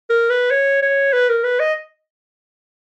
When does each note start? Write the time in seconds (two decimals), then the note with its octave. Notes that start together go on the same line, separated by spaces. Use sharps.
0.10 A#4
0.30 B4
0.51 C#5
0.82 C#5
1.13 B4
1.29 A#4
1.44 B4
1.60 D#5